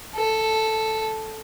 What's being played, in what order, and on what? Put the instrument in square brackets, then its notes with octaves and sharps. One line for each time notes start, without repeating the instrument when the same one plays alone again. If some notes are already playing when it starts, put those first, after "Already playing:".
[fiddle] A4